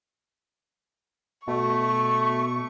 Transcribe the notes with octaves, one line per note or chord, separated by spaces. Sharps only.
B2 A3 C#6